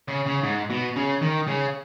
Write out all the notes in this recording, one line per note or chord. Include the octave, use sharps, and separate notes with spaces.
C#3
C#3
G#2
B2
C#3
D#3
C#3